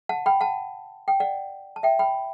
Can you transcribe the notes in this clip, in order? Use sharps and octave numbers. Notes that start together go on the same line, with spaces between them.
F#5 A5
G5 B5
F#5 A5
G5
D5 F#5
A5
E5 G5
G5 B5